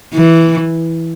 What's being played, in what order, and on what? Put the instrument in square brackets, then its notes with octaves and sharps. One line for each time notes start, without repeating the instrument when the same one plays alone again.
[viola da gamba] E3